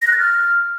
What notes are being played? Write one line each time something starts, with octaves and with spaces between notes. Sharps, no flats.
A#6
F#6
A6
F6